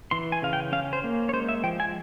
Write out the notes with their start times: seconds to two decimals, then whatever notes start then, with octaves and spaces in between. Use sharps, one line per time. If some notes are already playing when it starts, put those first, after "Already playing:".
0.11 E3 C6
0.32 G#5
0.42 C#3 F5
0.53 G5
0.72 C#4 F5
0.93 C5
1.04 A#3
1.29 C#5
1.33 G#3 C5
1.49 E5
1.64 F3 G5
1.80 G#5